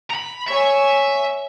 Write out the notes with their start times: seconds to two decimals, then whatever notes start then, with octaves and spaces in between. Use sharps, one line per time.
0.11 A#5 B5
0.48 C#5 E5 G#5